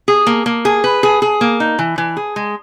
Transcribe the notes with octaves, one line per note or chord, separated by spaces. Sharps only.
G#4
A#3
A#3
G#4
B4
G#4
G#4
A#3
D#4
E3
E3
G#4
G#3